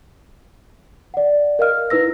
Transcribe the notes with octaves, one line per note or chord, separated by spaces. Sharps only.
D5 F#5
A#4 D#5 F5 F6
D#4 E4 B4 E6 A#6